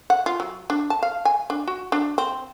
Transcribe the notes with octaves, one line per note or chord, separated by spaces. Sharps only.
F#5
F4
F#3
D4
A5
F5
G#5
D4
F#4
D4
C4